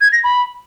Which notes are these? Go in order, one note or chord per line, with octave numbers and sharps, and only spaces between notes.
G#6
A#6
B5